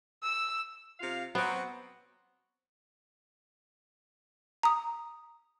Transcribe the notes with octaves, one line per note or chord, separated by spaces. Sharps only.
E6
C3 F4 F5
F#3 B3 C4
A#5 D#6